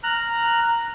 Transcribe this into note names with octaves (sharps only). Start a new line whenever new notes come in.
A#5 F6 F#6